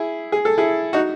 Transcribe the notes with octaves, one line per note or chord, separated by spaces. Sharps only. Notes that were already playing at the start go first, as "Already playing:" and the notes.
Already playing: E4 G#4
G#4
A4
E4 G#4
D#4 F#4